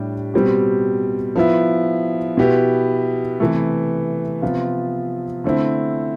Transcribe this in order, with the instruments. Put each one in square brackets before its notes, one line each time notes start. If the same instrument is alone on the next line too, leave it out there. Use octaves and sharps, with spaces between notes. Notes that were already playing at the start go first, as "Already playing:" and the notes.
Already playing: [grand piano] A2 G3 D4 G4
B2 G3 C4 G4
F3 B3 E4
B2 B3 E4 G4
C3 E3 A3
C3 F3 B3 F4
D3 A3 C4 E4